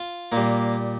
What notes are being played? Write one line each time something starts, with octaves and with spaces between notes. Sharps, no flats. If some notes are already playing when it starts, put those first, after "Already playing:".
Already playing: F4
A#2 G3 A#3